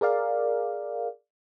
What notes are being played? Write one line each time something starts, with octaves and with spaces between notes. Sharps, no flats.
G#4 A#4 D5 F5